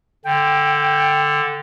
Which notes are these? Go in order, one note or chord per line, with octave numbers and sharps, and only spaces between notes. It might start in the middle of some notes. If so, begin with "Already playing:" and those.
D3 G5